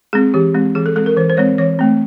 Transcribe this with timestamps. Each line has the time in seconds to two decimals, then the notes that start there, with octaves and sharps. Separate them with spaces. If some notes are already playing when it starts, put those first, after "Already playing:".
0.13 G#3 C4 G#4
0.34 E3 G4
0.54 G#3 C4
0.75 E3 G#4
0.86 A4
0.96 G#3 C4 A4
1.06 A#4
1.17 E3 C5
1.30 C5
1.37 G#3 C4 C#5
1.58 E3 C#5
1.79 A3 C4